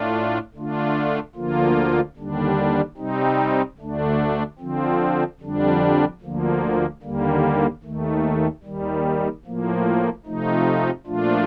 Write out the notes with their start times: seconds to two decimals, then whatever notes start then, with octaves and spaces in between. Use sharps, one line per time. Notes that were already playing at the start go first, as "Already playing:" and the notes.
Already playing: A2 A3 D4 F4
0.54 D3 A3 D4 F4
1.35 D2 D3 F3 A#3 F4
2.16 D#2 D3 G3 D4
2.97 C3 G3 C4 D#4
3.78 D2 D3 A3 D4
4.59 D3 F3 C4
5.40 F2 D3 G3 D4
6.21 D2 D3 F3 A#3
7.02 D#2 D3 G3 A#3
7.83 D#2 D#3 A3
8.63 D#2 D#3 G3
9.45 A2 F3 A#3
10.26 C3 F3 A3 D#4
11.06 A#2 F3 A3 D4 F4